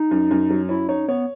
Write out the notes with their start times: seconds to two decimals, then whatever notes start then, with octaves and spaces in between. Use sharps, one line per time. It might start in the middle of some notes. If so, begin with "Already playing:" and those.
Already playing: D#4
0.11 F#2
0.31 F#2
0.50 F#3
0.69 C#4 E4
0.88 D#4 C#5
1.08 B3 C#5